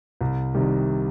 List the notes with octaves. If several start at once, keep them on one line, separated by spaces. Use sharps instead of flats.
C2
C3 D#3 G3